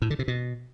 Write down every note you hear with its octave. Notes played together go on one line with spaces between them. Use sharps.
A2
D3
C3
B2